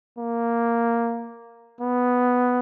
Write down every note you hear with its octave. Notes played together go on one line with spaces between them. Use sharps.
A#3
B3